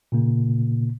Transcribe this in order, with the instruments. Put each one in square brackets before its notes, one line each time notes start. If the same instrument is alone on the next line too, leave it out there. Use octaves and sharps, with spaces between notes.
[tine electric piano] A#2 C#3 A#3